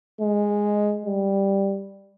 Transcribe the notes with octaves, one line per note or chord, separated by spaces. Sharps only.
G#3
G3